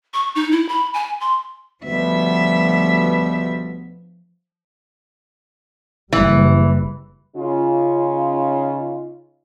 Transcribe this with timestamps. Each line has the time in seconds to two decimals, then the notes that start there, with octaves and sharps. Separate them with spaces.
0.14 C#6
0.35 D#4
0.52 E4
0.69 B5
0.94 G#5
1.21 C6
1.84 D2 B2 F3 G3 B3 E5
6.13 F#1 E3 G3
7.36 C#3 C#4 D#4 F4